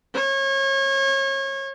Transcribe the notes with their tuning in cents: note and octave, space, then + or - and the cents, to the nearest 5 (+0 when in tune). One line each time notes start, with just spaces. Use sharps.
C#5 -30